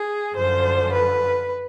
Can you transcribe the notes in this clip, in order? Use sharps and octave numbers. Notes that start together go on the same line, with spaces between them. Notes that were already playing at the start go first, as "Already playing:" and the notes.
Already playing: G#4
F#2 D3 F3 C5
B4